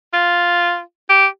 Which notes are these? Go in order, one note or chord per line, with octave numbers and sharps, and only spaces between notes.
F4
G4